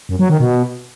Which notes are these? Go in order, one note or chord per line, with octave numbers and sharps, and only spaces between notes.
F#2
F#3
D#3
B2